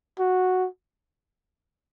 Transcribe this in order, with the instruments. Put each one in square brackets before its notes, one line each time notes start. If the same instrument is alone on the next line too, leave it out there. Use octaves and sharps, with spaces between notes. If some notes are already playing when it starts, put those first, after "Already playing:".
[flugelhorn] F#4